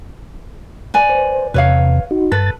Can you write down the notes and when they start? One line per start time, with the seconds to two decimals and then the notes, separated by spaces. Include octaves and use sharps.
0.94 B4 D5 G#5
1.09 C5
1.54 E2 C3 B4 C#5 F5
2.11 D#4 F#4
2.32 G2 A4 B4 A6